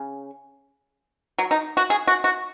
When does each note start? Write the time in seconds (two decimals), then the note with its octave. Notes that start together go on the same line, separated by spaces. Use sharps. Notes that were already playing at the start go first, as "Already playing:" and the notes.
Already playing: C#3
1.38 F#3
1.51 D#4
1.77 F#4
1.90 G#4
2.07 F#4
2.24 F#4